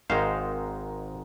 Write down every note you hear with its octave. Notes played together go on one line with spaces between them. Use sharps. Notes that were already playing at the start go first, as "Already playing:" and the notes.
G#1 G#2 D#3 G#3 D#4 C5 F5